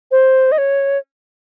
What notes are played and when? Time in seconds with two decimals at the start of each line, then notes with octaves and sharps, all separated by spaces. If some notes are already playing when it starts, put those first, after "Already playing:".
0.11 C5
0.52 D#5
0.58 C#5